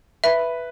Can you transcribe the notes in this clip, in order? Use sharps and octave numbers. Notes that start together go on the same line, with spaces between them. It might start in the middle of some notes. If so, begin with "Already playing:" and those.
B4 E5